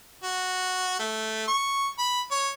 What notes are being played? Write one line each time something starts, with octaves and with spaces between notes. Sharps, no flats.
F#4
A3
C#6
B5
C#5